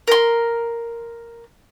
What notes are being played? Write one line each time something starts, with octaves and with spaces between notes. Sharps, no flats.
A#4 C6